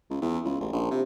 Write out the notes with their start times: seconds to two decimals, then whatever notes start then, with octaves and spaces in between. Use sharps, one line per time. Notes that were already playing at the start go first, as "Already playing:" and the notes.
0.10 C#2
0.22 E2
0.45 C#2
0.60 A1
0.73 A#1
0.91 C3